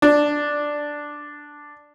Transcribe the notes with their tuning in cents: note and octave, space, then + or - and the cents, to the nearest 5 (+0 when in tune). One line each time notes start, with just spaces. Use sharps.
D4 +0